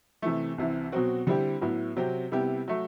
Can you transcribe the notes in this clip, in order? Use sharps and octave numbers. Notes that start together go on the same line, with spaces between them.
C3 E3 A3
C2 C3 E3
B2 F#3 C4 F#4
D3 G3 C4 E4 G4
A2 F#3 B3 E4
C3 F#3 C4 G4
C3 G3 B3 E4 G4
F#3 A3